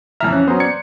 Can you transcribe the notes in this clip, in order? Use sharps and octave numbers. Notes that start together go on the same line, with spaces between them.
F2 E3 E5 A#5 F6
C#4 F#6
F#3 B3 C#4 C5 A#5 D#6
D5 G#6 C#7